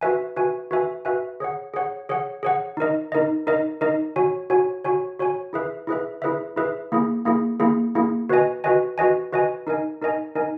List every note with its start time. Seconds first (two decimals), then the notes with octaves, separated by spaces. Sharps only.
0.01 F#4 B4 E5 G#5
0.36 F#4 B4 E5 G#5
0.71 F#4 B4 E5 G#5
1.05 F#4 B4 E5 G#5
1.40 G#4 C#5 F#5
1.74 G#4 C#5 F#5
2.09 G#4 C#5 F#5
2.43 G#4 C#5 F#5
2.77 D#4 A#4 D#5
3.12 D#4 A#4 D#5
3.47 D#4 A#4 D#5
3.81 D#4 A#4 D#5
4.16 F#4 C#5 G#5
4.50 F#4 C#5 G#5
4.84 F#4 C#5 G#5
5.19 F#4 C#5 G#5
5.53 E4 G#4 B4 E5
5.87 E4 G#4 B4 E5
6.22 E4 G#4 B4 E5
6.56 E4 G#4 B4 E5
6.92 A#3 E4 G#4
7.25 A#3 E4 G#4
7.60 A#3 E4 G#4
7.95 A#3 E4 G#4
8.29 F#4 B4 D#5 G#5
8.64 F#4 B4 D#5 G#5
8.98 F#4 B4 D#5 G#5
9.33 F#4 B4 D#5 G#5
9.67 D#4 A#4 D#5 G#5
10.02 D#4 A#4 D#5 G#5
10.35 D#4 A#4 D#5 G#5